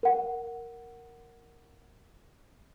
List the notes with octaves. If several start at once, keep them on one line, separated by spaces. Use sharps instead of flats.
A#4 F#5